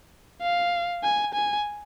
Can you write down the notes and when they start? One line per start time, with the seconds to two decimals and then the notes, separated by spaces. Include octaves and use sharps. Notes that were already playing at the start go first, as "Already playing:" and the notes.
0.42 F5
1.03 G#5
1.34 G#5